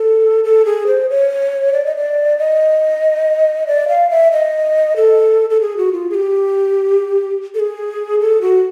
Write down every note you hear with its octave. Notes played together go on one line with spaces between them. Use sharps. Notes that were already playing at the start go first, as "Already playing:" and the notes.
Already playing: A4
A4
G#4
C5
C#5
D5
D#5
D5
D#5
D5
F5
E5
D#5
A4
A4
G#4
F#4
F4
G#4
G4
A4
G#4
A4
F#4